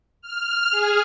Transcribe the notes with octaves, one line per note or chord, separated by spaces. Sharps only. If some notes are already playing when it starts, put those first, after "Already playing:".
F6
G#4